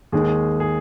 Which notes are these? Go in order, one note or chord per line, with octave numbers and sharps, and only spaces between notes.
D#2 D#3 G#3 G#4
G#4